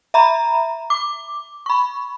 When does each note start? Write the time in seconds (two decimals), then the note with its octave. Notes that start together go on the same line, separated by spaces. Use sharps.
0.14 E5 A#5 B5
0.90 D6
1.66 B5 C#6